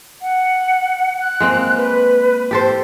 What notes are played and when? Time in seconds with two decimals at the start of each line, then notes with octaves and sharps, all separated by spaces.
0.22 F#5
1.21 F#6
1.40 G#3 A#3 C4
1.77 B4
2.51 G4 A4 C5